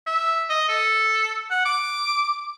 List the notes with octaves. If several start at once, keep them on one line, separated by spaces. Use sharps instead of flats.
E5
D#5
A4
F#5
D6